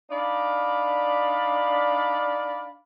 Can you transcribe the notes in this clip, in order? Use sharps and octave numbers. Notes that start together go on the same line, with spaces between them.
D4 D#4 D5 F5 B5